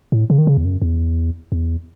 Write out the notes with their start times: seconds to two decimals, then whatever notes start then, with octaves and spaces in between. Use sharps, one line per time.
0.12 A2
0.30 C#3
0.38 D#3
0.47 C#3
0.57 E2
0.65 F#2
0.82 E2
1.52 E2